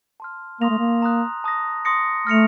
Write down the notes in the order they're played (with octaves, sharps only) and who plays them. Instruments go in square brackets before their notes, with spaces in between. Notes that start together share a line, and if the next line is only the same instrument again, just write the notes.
[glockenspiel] A5 C6 F6
[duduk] A#3 [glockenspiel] C6 D#6 A#6 F7
[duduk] A3
A#3
[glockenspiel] A#5 D#6 F#6
A5 D#6 A#6
C6 D#6 A#6 C#7
[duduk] A3 [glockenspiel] F6 A#6 C#7 F7